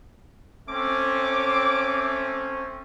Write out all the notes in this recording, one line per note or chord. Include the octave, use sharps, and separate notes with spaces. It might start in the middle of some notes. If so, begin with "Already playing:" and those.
A3 C4 C#4 D6